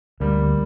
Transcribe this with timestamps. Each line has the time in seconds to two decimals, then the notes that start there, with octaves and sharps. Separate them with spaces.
0.20 D2 G3 A#3